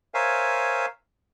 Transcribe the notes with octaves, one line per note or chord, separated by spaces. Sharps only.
A#4 C5 C#5 E5 F5 G#5